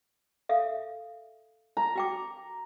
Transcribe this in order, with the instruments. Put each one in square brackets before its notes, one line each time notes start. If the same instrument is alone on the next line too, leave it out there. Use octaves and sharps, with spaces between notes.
[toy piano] A4 E5 F5
[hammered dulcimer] A#5
[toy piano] F#4 G5 D6